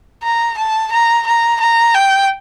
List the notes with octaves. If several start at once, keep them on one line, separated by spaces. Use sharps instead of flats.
A#5
A5
A#5
A#5
A#5
G5